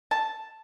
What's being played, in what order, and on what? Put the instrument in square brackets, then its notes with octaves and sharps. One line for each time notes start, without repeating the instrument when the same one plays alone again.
[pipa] A5